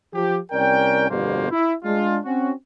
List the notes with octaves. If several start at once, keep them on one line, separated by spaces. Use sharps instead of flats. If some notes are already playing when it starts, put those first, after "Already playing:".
F3 G4
C2 C#4 A#4 D5 G5
G1 F2 B2 G3 A#3 C5
E4
G#3 D4 F4
C4 C#4 F#4